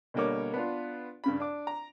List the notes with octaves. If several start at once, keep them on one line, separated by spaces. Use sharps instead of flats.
B2 D3 G3 A#3 C#5 D6
B3 D4 F4
G2 C#3 B5
D4 D6
A#5